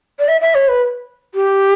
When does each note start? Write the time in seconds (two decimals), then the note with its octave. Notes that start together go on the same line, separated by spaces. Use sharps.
0.19 D5
0.28 E5
0.41 E5
0.54 C#5
0.68 B4
1.34 G4